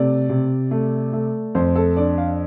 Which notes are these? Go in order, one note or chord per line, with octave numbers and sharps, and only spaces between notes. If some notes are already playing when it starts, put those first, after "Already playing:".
Already playing: C3 A3 D5
C3
A3
A3
F2 C5
A4
D4 D5
F5